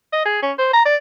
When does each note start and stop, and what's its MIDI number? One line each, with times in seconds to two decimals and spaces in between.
0.13 0.21 75
0.25 0.40 68
0.42 0.52 61
0.59 0.70 72
0.73 0.81 82
0.85 0.96 74